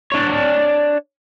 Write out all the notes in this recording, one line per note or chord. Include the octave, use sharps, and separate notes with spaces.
D4 C#5